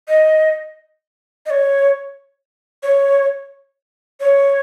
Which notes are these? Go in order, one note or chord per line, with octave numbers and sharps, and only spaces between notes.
D#5
D#5
C#5
C#5
C#5